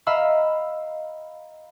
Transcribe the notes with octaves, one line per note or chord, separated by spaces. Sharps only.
D#5 F5 A#5 B5 E6 F6